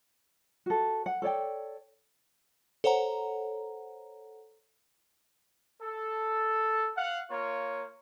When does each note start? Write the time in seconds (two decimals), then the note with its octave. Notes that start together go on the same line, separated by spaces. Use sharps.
0.66 F#4 A4
1.06 F#5
1.22 A4 C#5 D5 G5
2.84 A4 C5 C#5 F#5 A#5
5.80 A4
6.96 F5 F#5
7.30 A#3 F4 C#5